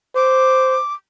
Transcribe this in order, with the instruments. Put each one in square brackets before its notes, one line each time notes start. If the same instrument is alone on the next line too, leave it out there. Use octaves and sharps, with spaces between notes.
[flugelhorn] C5 [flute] D6